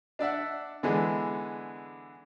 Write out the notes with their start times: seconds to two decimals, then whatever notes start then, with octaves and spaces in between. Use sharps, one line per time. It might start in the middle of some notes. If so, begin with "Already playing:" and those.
0.19 D4 D5 E5 F#5
0.83 D3 E3 G#3 B3 D4